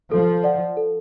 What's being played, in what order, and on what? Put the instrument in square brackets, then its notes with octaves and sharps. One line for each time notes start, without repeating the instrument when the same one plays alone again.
[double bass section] F3 [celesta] A4
[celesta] D5 F#5
A4